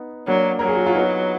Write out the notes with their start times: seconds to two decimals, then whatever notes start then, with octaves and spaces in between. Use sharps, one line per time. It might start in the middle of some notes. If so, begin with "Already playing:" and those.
Already playing: B3 D#4
0.27 F#3 A#3 D4
0.59 F#3 A#4
0.68 G#4
0.76 F#4
0.86 F4
0.95 B3 D#4